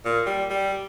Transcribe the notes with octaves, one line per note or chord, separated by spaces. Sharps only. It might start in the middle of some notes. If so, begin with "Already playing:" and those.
A#2
G3
G3